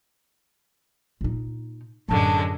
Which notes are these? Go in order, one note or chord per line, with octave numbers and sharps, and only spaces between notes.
A#2 D#4
F#2 A2 D3 F#3 G#3 A5